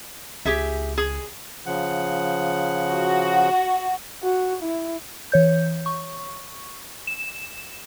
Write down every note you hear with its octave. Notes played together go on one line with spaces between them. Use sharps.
C#2 G4 G#4 E5
G#4
C#3 F3 F#5
F#4
F#4
E4
E3 C#5 G6
C#6
E7